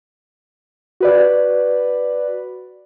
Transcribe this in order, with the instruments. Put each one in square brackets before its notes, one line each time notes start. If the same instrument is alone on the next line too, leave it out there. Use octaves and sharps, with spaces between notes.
[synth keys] F#4 B4 D5